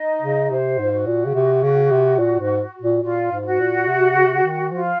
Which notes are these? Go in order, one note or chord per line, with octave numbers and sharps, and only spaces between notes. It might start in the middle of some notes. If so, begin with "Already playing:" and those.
Already playing: D#4 D#5
C#3
C3 C5
G#2 F4
F#4
A#2
C#3
C3
C#3
C3
A#2
G#2
A#2
A#2 F4
G#2
F4
F#4
A#2
C3
C#3
C3
C#3
D#3
F3 F4